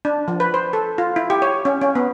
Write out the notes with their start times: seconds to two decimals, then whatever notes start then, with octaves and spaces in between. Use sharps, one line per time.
0.05 D4
0.28 F3
0.40 B4
0.54 C5
0.73 A4
0.98 F4
1.16 E4
1.30 G4
1.42 C#5
1.65 C#4
1.81 C#4
1.95 B3